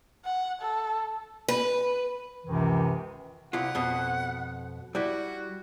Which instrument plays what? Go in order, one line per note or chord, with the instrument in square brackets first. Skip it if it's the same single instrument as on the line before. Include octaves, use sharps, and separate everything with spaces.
[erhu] F#5
A4
[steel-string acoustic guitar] B4
[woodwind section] C#2 F#2 C3 D#3 E3
[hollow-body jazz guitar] C2 E4 F4 [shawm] F#5
[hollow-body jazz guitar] F2 B2
[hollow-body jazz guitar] G3 E4 [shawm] F#4